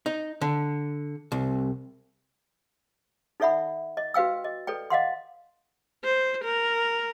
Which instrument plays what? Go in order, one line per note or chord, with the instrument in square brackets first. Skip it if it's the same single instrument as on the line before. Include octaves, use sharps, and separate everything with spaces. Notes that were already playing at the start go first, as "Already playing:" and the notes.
[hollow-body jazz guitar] D#4
D3
C2
[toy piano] D#4 A4 D5 E5 F#5 B5
D#5
F#4 B4 F5 G5 E6
D#5
A4 B4 D5 G5
D#5 F5 F#5 C6
[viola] C5
A#4